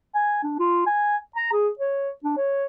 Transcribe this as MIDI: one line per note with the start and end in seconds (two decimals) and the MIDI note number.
0.15 0.42 80
0.43 0.57 62
0.59 0.85 65
0.86 1.17 80
1.36 1.50 82
1.52 1.68 68
1.79 2.10 73
2.24 2.33 62
2.37 2.66 73